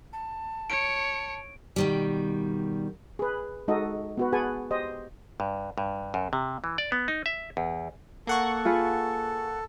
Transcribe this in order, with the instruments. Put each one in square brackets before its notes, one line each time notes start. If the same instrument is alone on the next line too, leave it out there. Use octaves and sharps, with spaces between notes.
[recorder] A5
[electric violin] C#5 C#7 [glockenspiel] D7
[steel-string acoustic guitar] B2 D#3 G3
[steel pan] G#4 B4
G#3 D#4 F#4 A4 D#5
B3 F#4 B4
F#4 G#4 B4 F#5 G#5 A5
G4 C5 D#5
[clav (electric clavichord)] G2
G2
F#2
C3
E3
D5
B3
D#4
E5
E2
[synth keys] A#3 F#5 C#6 [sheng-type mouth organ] A4
[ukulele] F4 G#4 B4